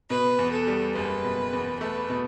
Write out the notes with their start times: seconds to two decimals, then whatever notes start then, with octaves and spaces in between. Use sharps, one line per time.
0.10 B2 B4
0.39 E2
0.53 A4
0.67 G3
0.96 F#1 B4
1.24 B2
1.53 E2
1.81 A3 B4
2.10 B2